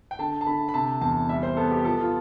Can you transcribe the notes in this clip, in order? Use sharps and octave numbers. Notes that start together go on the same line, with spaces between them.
G5
D3 A5
A5
D3 B5
B5
C3 A5
E2 A5
G3 E5
C5
B3 A4
G4
F3 A4
F4